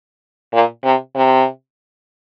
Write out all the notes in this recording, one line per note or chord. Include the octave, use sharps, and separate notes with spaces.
A#2
C3
C3